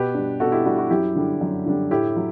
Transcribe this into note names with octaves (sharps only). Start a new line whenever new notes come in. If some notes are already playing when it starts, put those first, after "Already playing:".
Already playing: B2 G4 B4
G3 D4
B2 F#4 A4
E4 G4
G3 D4 F#4
F#4
F#2 E4 G4
D3 G3 D4
F#2
D3 G3 D4
A2 E4 G4
F#3